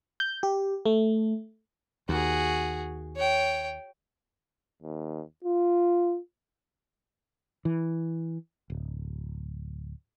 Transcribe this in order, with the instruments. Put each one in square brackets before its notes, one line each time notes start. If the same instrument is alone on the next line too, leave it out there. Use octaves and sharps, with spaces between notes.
[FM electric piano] G6
G4
A3
[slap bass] D#2 [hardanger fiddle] F#4 G#4
[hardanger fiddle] C#5 G5
[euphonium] D#2
F4
[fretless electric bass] E3
D1